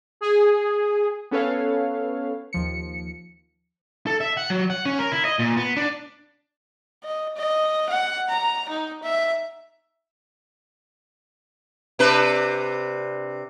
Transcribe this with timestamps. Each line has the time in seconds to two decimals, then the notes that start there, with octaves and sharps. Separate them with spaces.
0.21 G#4
1.31 B3 C#4 A4 B4 C#5 F5
2.53 D#2 F3 C#7
4.07 A4
4.20 E5
4.37 F#5
4.50 F#3
4.70 F#5
4.85 C#4
4.99 A#4
5.12 E4
5.25 D#5
5.39 A#2
5.57 B3
5.77 D4
7.04 D#5
7.37 D#5
7.89 F#5
8.29 A#5
8.69 D#4
9.03 E5
11.99 C3 D4 B4